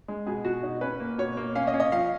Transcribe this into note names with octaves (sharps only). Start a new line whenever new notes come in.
G#3
B2 G#4
B2 F#4
D#4
C#4 B4
A#3
B2 C#5
A#3
C#4 F5
D#5
C#4
D#5
F3 F5